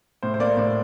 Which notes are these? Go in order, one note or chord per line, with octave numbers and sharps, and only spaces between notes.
A2 C5
C5
A#3 D5
A2 C5